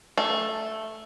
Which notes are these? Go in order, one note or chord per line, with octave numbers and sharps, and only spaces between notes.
A3